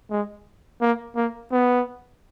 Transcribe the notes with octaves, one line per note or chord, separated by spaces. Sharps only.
G#3
A#3
A#3
B3